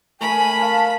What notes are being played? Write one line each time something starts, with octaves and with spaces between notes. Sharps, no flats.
A3 A#4 G#5 B5
F5 G#5 A5